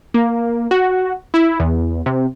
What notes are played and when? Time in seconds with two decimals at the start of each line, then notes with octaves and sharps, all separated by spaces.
0.14 A#3
0.71 F#4
1.34 E4
1.60 E2
2.06 C3